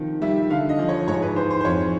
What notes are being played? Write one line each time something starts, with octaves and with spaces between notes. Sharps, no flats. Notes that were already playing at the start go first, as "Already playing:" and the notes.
Already playing: C3 D#3 F3
G3 E5
D3 F5
D#5
F3
C#5
G#2 C#5
B4
E3 C5
C5
C5
F2 C#5